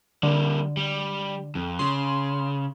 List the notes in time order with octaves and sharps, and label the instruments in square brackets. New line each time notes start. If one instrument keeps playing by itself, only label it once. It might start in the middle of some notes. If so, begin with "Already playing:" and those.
[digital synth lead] D3 [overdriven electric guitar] G3 A#3
[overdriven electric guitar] G3
F2
[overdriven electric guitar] C#3 [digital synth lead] C6